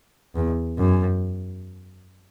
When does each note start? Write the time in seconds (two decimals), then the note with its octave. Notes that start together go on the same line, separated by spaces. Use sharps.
0.35 E2
0.78 F#2